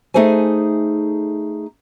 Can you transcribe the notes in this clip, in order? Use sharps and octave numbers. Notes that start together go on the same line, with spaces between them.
A3 D#4 G#4 A4 C5 G#5